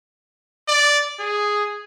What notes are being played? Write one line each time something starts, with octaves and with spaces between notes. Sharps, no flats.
D5
G#4